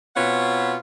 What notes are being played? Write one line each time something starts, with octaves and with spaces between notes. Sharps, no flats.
B2 B3 C4 F4 C#5 F#5